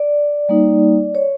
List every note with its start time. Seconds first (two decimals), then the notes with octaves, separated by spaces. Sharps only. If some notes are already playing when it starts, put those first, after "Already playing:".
Already playing: D5
0.49 G3 A#3 D#4
1.15 C#5